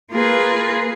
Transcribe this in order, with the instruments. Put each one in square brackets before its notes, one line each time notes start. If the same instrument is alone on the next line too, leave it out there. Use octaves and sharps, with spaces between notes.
[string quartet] A#3 F4 G#4 B4